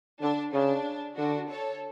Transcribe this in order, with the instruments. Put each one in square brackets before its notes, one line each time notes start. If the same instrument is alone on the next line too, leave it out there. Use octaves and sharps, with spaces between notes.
[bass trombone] D3 [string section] D4
[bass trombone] C#3 [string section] D4
[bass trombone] D3 [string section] D4 F#4
[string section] A4 C#5